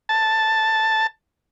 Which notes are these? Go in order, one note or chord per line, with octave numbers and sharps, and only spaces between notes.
A5